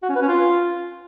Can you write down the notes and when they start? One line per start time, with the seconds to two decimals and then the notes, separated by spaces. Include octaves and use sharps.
0.03 F#4
0.09 C#4
0.16 B4
0.22 C#4
0.28 F4